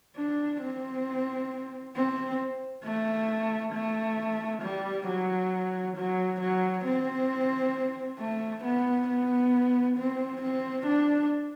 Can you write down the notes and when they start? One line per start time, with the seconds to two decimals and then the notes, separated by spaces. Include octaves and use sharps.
0.16 D4
0.62 C4
1.95 C4
2.84 A3
3.73 A3
4.62 G3
5.08 F#3
5.97 F#3
6.41 F#3
6.85 C4
8.19 A3
8.64 B3
9.08 B3
9.97 C4
10.42 C4
10.86 D4